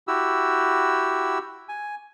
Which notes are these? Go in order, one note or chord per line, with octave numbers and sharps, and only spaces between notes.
E4 F#4 G4 E6
G#5